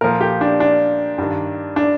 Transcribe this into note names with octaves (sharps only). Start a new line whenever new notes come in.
A#2 F3 A#4
G4
D4
D4
G2 D#3
D4